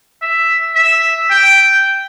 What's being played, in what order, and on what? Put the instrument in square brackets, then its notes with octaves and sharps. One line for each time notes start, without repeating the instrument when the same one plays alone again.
[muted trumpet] E5
E5
G5